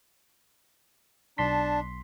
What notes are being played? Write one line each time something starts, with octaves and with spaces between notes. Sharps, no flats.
B1 D4 A5 C6 B6